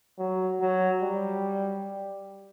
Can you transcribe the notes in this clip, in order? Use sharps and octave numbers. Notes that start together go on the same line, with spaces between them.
F#3
F#3
G3